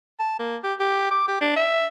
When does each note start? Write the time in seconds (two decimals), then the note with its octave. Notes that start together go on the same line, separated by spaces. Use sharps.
0.20 A5
0.39 A#3
0.64 G4
0.80 G4
1.11 D6
1.28 G4
1.41 D4
1.56 E5